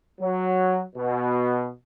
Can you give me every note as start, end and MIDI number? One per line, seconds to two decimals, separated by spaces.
0.21 0.82 54
0.96 1.70 47